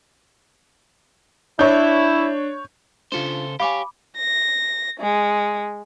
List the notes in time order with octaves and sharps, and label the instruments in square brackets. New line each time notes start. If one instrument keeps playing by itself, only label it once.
[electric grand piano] D4 [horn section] E4 [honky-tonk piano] C#5 G6
[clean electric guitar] C#3 A4 C5 [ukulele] D4 F4
[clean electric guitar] G4 C#5 [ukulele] F5 G#5 [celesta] B5 D6
[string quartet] A#6
G#3